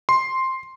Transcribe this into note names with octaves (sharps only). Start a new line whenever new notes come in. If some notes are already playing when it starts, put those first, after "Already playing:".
C6